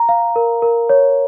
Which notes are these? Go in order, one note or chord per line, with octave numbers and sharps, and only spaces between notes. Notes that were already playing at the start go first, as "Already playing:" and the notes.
Already playing: A#5
F5
A#4
A#4
C#5